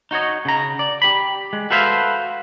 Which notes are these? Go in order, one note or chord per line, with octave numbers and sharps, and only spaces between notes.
D#4 F#4 C#5 D#5
C#3 A#5
D5
G4 B5
G#3
F#4 A4 B4 C5 E5 F5